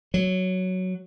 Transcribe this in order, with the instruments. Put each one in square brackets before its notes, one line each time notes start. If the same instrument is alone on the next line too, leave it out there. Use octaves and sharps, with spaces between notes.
[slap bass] F#3